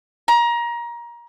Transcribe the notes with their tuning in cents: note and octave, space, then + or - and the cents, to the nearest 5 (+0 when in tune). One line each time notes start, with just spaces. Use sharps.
A#5 +25